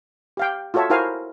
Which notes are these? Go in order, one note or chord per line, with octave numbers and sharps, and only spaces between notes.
G4 F5 G5
F4 F#4 A4 C#5 E5 A5
E4 F#4 A#4 C5 F5 G#5